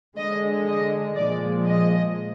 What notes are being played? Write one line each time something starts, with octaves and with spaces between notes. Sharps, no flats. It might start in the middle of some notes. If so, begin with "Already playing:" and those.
D3 G#3 D#5
D#5
A#2 F3 G#3 D5
D#5